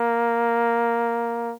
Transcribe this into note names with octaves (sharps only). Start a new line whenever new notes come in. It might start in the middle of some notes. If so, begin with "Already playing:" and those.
Already playing: A#3